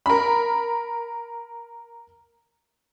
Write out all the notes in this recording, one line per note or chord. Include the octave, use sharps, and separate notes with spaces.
A#4 B5